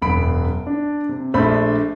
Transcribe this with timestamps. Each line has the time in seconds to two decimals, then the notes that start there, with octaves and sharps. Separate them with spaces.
0.02 E1 F#2 B5 D7
0.67 D4
1.09 C3
1.34 A#1 A3 D4 C5 B5